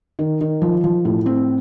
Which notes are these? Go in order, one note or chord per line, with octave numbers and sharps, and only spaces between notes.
D#3
D#3
F3
F3
A2
C4